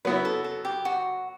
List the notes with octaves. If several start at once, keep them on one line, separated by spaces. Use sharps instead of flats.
F#3 B3 E4 B4
A4
A4
G4
F#4